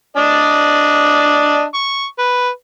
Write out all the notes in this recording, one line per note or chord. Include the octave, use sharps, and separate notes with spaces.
D4 D5 D#5
C#6
B4